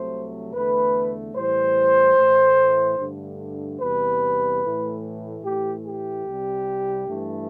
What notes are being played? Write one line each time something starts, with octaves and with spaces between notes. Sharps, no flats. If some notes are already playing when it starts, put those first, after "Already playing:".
Already playing: C2 C3 F#3 A3 C5
E2 D3 A3 B4
A2 E3 G3 C5
A2 E3 A3
G2 D3 A3
E2 C3 G3 B4
A2 E3 A3
A2 E3 A3 G4
G4
C2 C3 G3
G2 E3 A3